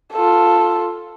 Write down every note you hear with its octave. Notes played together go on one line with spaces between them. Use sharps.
F4 A4